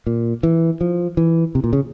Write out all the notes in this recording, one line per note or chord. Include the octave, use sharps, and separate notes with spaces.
A#2
E3
F3
E3
C3
A#2
C#3